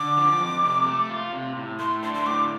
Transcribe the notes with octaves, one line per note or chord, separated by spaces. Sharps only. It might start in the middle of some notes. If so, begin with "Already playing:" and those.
Already playing: D3 D6
F3
F2
C3
A3
F4
C3
A2
A3 C6
D4 C6
C6
A2 D6